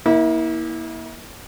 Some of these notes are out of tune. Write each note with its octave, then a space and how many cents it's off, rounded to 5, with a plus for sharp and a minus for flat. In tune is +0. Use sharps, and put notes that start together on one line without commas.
A#3 +25 E4 -30